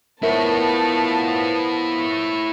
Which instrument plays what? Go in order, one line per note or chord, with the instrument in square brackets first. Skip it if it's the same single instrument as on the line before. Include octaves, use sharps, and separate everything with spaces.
[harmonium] F3 B3 [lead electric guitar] E4 C#5 [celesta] A#4 E5 [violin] A5